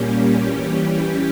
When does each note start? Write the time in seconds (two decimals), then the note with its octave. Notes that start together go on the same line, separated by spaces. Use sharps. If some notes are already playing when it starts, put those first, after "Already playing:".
Already playing: A#2 G3 A#3 C#4 G4
0.36 E3 G3 C#4 G4